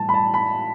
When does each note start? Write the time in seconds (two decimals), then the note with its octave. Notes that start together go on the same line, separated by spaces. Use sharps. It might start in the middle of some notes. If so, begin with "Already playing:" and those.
Already playing: A2 E3 G3 A5
0.09 B5
0.14 A5
0.34 B5